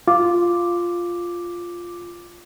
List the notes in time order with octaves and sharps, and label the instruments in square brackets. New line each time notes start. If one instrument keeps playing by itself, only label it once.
[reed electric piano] F4 [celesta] D6